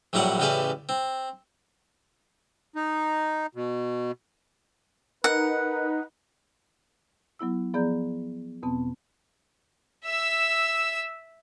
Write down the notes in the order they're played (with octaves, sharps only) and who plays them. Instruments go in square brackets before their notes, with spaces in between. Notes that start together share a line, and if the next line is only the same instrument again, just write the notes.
[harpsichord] A#1 A2 F#3 G3 D5 F#5
A1 C#3 E3 G4 A4 D5
C4
[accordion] D#4
B2
[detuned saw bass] D#4 [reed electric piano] A#4 [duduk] B4 [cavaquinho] F#5
[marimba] F#3 B3 E4 E6
F3 B3 G#4 D5 A#5 G6
E2 B2 B3 C4 A5
[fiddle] E5 E6